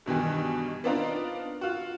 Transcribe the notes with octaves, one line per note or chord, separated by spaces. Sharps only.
G2 B2 D#3 E3
B3 C4 D4 D#4 F4 A#4
F4 F#4